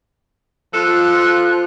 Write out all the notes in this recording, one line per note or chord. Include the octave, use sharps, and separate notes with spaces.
F3 F4 A4 F#6